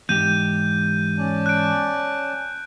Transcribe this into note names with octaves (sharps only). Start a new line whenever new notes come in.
E2 G#2 G4 G6 D#7
C#4 D5 A5
F#6 D7